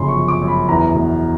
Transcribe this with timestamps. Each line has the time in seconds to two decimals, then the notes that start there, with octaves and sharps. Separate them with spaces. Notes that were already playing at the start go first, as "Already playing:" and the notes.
Already playing: G1 F#2 C#3 F3 B5 C6
0.08 C#6
0.15 F3
0.28 D6
0.42 F#2
0.48 B5
0.69 E2 A#5
0.94 B2